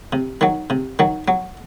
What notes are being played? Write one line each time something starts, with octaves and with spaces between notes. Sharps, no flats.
C3
D#3 F#3
C3
D#3 F#3
F#3